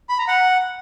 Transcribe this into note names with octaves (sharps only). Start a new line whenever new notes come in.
B5
A#5
F#5